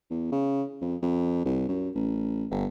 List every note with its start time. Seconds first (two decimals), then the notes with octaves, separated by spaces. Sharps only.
0.11 E2
0.32 C#3
0.81 F2
1.02 F2
1.45 C2
1.69 F#2
1.95 A1
2.51 G1